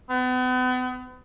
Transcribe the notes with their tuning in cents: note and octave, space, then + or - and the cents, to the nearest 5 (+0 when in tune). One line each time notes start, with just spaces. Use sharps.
B3 +40